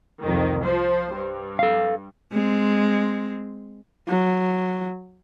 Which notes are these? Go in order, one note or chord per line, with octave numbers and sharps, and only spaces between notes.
C2 F2 D#3
F3 C5
G2
A4 F5
G#3 C4
F#3